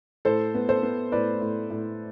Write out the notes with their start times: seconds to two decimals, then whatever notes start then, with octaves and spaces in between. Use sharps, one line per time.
0.25 A2 A4 C5
0.55 B3
0.69 A4 C5
0.83 B3
1.12 A2 B4 D5
1.41 A2
1.70 A2